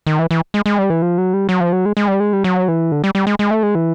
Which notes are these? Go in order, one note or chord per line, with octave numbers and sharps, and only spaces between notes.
D#3
E3
E3
G#3
G#3
G3
E3
F3
F#3
G3
F#3
F3
F#3
G#3
G#3
G3
G#3
G3
F#3
E3
D3
G3
G3
G#3
G#3
A3
G#3
E3